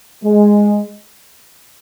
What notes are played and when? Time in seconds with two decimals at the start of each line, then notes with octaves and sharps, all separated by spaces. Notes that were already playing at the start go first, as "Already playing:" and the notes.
0.24 G#3